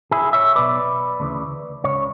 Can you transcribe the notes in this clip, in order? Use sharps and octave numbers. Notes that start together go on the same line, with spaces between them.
E4 G#4
C#5 E5
B1 B2 B4 D5
D2 C#3 E3
C#2 C#3 C#5